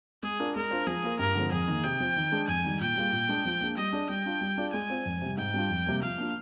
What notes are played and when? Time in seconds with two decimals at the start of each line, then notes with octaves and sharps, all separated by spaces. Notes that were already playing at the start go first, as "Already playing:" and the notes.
0.23 G#3 G#4
0.39 D4 F4 A#4 D5
0.56 G#3 A#4
0.71 D4 F4 C5
0.87 F3 G#4
1.04 A#3 F4 A#4
1.19 G2 A#4
1.35 D3 F3 G#3 C4
1.52 F2 G#4
1.68 D#3 A#3
1.84 C3 G5
2.00 F3 C4
2.16 D#3
2.32 G#3 D4 G#4
2.48 F2 G#5
2.64 D#3 G3
2.81 A#2 G5
2.96 G3 A#3 F4 G#4
3.12 A#2
3.29 G#3 D4 G#4
3.45 F3
3.61 A#3 D4 G#4
3.77 G3 D#5
3.93 D4 G#4 D5
4.09 G3 G5
4.26 D4 F4
4.41 G3
4.57 D4 F4 G#4 D5
4.73 G#3 G#5
4.90 C4 F4
5.06 F2
5.22 C3 G3
5.38 G#2 G5
5.54 G3 D4 F4
5.70 F2
5.86 C3 G3 A#3
6.02 F3 F5
6.18 A#3 D4 F4